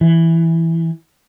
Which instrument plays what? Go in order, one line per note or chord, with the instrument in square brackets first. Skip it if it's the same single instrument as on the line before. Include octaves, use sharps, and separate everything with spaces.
[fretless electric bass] E3